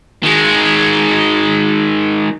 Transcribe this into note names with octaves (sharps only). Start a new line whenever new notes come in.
D#3 G#3